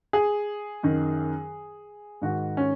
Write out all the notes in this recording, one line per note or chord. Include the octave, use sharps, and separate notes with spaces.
G#4
F#2 D#3
G#2 D#3 F#4
C#4